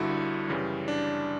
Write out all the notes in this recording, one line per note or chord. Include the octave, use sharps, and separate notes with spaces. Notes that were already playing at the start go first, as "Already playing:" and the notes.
Already playing: G1 G2 D3 E4 F#4
F#2 C#3 E3 G3
D4